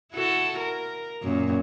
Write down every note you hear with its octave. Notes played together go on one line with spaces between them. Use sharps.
E4 F#4 A4
A#4
F#2 A#2